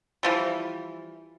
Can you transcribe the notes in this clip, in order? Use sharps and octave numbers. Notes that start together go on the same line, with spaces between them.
E3 F3 G3